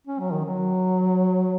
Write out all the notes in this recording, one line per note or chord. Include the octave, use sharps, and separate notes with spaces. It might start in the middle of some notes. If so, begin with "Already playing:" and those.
C#4
F#3
D#3
F#3